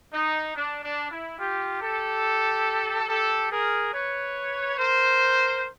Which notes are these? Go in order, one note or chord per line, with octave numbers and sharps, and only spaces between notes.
D#4
D4
D4
E4
F4 G4
G4 A4
G4 A4
G#4 A#4
B4 C#5
A#4 C5